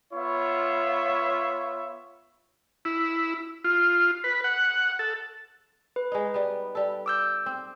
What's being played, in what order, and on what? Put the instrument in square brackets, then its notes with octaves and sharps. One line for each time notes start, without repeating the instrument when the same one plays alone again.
[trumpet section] B3 F4 C#5 E5
[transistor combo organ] E4
F4
B4
F#5
A4
[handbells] B4
[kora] G#3 D#4
G3 B3
G3 A4
[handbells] D6 E6 G6
[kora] C4